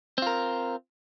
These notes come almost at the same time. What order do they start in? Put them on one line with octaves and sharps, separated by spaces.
C4 F4 A#4